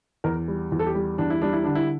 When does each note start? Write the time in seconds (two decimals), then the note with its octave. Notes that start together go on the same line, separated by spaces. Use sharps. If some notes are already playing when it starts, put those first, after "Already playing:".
0.24 E2 A#4
0.48 G3
0.72 E2
0.79 A4
0.86 G4
0.95 G3
1.18 E2 D4
1.30 E4
1.42 G3 D4
1.53 E4
1.64 D3 D4
1.75 E4